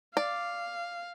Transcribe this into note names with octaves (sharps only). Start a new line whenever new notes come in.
D5 F5